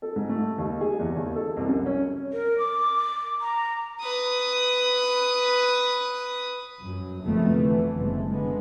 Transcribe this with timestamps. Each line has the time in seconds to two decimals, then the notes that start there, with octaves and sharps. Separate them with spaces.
0.02 A4
0.16 G#2
0.29 A3
0.58 D#2
0.81 G#4
0.99 E2
1.15 D#2
1.35 A4
1.57 C2
1.68 F#2
1.86 C#4
2.32 A#4
2.58 D6
3.41 A#5
4.00 B4 D#6
6.83 F#2 F#3
7.24 F1 F2 D#3 F3 A3 B3
7.56 D3 E3
7.96 F#1 C3 G#3 A3
8.29 D3 G#3 B3